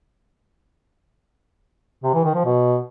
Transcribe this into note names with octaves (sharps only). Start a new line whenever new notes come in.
C3
E3
D#3
F3
B2